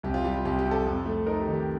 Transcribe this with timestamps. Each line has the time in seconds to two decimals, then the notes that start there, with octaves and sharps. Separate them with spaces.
0.03 C2 G4
0.14 F4
0.24 G3 G4
0.34 F4
0.45 C2 G4
0.59 G4
0.65 C3
0.71 A4
0.85 F2
1.06 A3
1.26 D#4 A#4
1.40 G4
1.47 D#3
1.54 G4